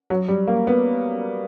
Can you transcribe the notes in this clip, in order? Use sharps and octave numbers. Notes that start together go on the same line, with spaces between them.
F#3
G3
A#3
B3